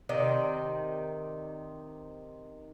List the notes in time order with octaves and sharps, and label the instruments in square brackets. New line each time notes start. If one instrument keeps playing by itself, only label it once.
[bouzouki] C3 D#3 D#4 D5